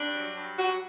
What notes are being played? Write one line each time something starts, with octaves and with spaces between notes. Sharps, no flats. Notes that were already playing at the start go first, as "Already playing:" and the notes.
Already playing: G2 D4
F#3
G2
F#3 F#4